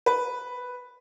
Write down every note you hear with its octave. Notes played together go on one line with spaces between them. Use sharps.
B4